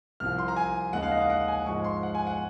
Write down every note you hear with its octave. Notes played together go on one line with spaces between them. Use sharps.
C2 C3 F3 F6
C6
A#5
G#5
D#2 C#3 G#3 F#5
F5
D#5
F5
F#5
G#5
G#2 F3 G#3 C#6
C6
F#5
G#5
F#5